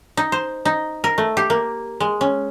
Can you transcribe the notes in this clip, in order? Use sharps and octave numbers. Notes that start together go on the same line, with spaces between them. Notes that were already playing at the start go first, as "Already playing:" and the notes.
D#4
C5
D#4
A#4
A3
G4
A#3
G#3
C#4